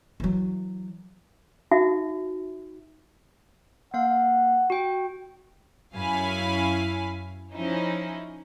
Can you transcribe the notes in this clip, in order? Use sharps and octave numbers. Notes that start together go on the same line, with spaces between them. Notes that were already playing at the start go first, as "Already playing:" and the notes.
E3 F#3
D#4 F#4 E5
A#3 F5 F#5
F#4 G5
F#2 C#4 E4 F5 G#5 B5
F3 C#4 D#4 E4